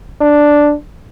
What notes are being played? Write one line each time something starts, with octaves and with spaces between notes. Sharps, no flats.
D4